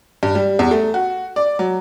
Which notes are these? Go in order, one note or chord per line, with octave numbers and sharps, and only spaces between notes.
G2
G3
E2
A3
F#4
D5
F#3